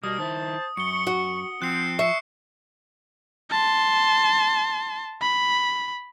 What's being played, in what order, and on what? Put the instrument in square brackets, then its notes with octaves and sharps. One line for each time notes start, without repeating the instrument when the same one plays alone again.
[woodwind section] B2 A#3 [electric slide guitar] G3 [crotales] D#6
[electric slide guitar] D#3 E4 [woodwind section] C5 A5
[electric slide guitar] F#2 [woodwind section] C#6 [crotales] C#7 G7
[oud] F#4
[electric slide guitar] F3 [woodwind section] C4 [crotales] F#6 C7
[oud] E5 [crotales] C#6 C7 C#7
[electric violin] A5 C6
B5